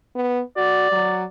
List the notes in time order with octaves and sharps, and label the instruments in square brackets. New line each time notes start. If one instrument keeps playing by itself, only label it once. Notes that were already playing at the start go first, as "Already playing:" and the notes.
[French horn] B3
[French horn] F#4 [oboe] D5
[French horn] F#3